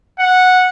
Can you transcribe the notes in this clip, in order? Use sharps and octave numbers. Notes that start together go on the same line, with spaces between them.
F#5